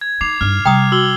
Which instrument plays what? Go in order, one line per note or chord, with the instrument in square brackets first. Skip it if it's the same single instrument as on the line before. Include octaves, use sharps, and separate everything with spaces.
[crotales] G#6
[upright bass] D#4 [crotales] D6 C7 F7
[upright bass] G2 D#4 [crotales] F6
[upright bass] C3 G3 [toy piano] G5 A#5 D#6
[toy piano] F#4 [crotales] E6 F#7 G7